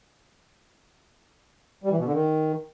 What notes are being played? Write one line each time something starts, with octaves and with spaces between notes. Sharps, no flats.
G3
E3
B2
D3
D#3